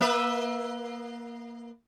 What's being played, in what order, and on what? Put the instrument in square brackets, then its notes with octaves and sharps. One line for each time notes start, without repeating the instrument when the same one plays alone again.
[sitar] A#3 B4 E5